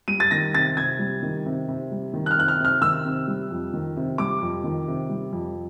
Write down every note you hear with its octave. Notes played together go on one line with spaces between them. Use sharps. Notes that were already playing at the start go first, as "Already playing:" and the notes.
G3 D#7
A6
D#3 A#6
C3 A6
C3 G#6
G3
D#3
C3
C3
G3
D#3
F#6
F6
C3 F#6
F6
C3 F6
D#3 E6
C3
G3
F2
D#3
C3
G3 D6
F2
D#3
C3
G3
F2